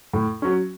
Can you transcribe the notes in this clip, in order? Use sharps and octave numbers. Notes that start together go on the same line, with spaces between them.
A2
F#3 C#4